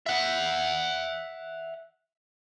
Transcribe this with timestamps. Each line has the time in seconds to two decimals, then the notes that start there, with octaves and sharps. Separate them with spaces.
0.06 E5 F#5